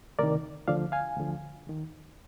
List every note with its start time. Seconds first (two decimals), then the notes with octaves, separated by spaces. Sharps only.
0.19 D2 C3 D#3 A#4 D5
0.68 D2 D3 F3 D5 F5
0.92 F5 G#5
1.17 D2 D3 F3
1.67 D#2 D#3